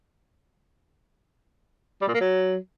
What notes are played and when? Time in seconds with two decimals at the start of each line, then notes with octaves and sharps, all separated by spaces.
2.01 G3
2.08 A#2
2.14 A#3
2.21 F#3